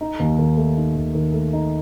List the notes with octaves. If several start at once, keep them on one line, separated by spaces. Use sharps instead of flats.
D#4
D#2
D#3
A3
D#4
D#2
D#3
A3
D#4